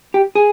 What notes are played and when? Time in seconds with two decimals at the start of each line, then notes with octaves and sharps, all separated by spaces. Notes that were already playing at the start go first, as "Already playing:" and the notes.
0.14 G4
0.35 G#4